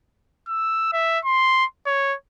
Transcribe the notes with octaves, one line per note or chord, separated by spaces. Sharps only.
E6
E5
C6
C#5